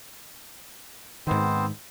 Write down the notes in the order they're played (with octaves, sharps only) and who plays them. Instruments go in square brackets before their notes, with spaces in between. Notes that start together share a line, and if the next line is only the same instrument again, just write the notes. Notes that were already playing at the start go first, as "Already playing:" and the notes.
[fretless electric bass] G#2 D#3 [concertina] B3 C4 C5